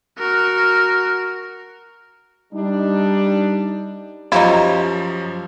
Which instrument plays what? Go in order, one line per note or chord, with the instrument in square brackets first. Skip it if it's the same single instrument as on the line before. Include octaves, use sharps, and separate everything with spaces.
[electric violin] F#4 A#4
[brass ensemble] G3 D4 D#4
[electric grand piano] F#2 F3 [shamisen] D#4 E4 [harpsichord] G4 C#5 [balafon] F5 A#5